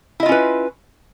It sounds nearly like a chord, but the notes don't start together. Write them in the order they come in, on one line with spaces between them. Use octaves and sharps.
E4 D#5 F4 C#4 B4